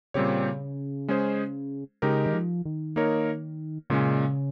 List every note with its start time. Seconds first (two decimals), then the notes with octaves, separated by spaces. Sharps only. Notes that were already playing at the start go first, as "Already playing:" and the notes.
0.14 A#2 C#3 G3 C4 G4 C#5
1.08 G#3 C#4 G#4 C5
2.02 C#3 G#3 D#4 G4 A#4
2.26 D#3
2.33 F3
2.66 D#3
2.96 A#3 D#4 A#4 C#5
3.90 A#2 C#3 G#3 C#4